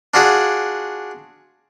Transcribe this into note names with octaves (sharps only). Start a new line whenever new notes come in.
D4 F4 F#4 G#4 D5